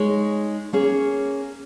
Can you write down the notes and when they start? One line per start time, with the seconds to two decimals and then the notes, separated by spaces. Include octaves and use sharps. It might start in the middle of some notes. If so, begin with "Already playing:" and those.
Already playing: G#3 D#4 G#4 C#5
0.73 A#3 C#4 G#4 C#5